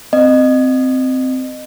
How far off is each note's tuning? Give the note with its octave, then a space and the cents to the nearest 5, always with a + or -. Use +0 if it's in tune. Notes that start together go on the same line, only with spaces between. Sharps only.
C4 -15 D#5 -25